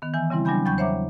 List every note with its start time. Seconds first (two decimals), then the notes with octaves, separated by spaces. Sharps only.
0.02 D#3 B3
0.14 E3 G#5 E6
0.30 C#3 G3 C4 E4
0.45 F#3 G3 D4 G#5 B5 G6
0.65 E2 F#3 G5 B5 C#6 G6
0.78 C5 C#5 E5 F#5 A#5 D6